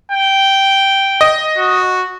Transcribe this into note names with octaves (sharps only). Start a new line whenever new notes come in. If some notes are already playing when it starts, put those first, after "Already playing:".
G5
D#5
F#4